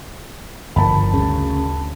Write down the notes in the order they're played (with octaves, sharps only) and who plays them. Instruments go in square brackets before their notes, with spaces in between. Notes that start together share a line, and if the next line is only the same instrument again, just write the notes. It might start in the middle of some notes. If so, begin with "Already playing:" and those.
[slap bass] G1 G#2 F3 [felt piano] A#4 A5 B5
[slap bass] D2 [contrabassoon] C#3